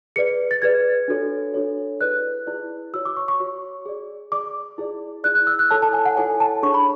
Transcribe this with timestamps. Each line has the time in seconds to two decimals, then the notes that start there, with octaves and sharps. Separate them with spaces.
0.16 G#4 B4 D5 C#7
0.51 A6
0.62 G#4 B4 D5 G#6
1.08 D4 F#4 A4 C#5
1.54 D4 F#4 A4 C#5
2.01 E4 G#4 B4 D5 F#6
2.46 E4 G#4 B4 D5
2.94 F#4 C#5 E6
3.05 D6
3.17 C#6
3.28 C#6
3.40 F#4 C#5
3.86 G#4 D5
4.32 G#4 D5 D6
4.78 E4 G#4 D5
5.24 E4 G#4 D5 F#6
5.35 F#6
5.47 E6
5.59 F#6
5.71 E4 A4 C#5 A5
5.82 A5
5.93 G#5
6.05 F#5
6.17 E4 A4 C#5 G#5
6.40 A5
6.62 D4 G#4 C#5 C#6
6.74 B5